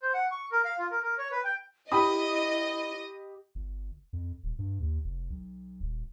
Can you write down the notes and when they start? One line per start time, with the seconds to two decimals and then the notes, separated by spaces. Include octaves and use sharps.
0.02 C5
0.14 F#5
0.31 C#6
0.52 A#4
0.65 F5
0.79 F4
0.91 A#4
1.03 A#4
1.18 C#5
1.32 B4
1.44 G5
1.92 E4 G4 D#5 B5 D#6
3.55 G1
4.13 F2
4.43 D#1
4.59 G2
4.80 D#2
5.04 F1
5.30 B1
5.81 D#1